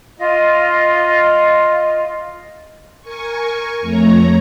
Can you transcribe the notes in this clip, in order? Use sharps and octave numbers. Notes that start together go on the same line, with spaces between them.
F4 D#5
A#4 G#5 C#6
F2 A3 C#5 A#5